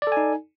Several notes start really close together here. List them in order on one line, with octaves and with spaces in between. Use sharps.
D5 A4 G#5 D#4